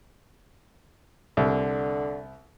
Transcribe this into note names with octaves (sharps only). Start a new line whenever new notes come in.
C2 D3